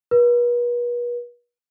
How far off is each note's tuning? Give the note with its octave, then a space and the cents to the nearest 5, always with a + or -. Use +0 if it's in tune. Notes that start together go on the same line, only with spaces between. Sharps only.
B4 -40